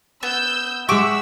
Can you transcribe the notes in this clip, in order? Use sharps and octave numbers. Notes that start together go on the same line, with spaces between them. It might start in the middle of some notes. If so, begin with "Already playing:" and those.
B3 E6 G6
G#3 G4 E5 F#5 C#6 D6 E6